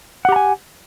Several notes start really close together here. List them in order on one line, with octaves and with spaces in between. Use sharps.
F#5 G4 A#5 G#5